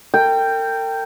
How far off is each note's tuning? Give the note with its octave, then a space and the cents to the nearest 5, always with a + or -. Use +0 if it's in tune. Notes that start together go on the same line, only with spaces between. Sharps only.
A#4 -45 G5 +0